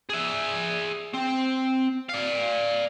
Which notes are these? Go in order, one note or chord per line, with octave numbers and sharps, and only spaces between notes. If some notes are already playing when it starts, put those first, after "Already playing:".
G#4 E5
C4
D5 F5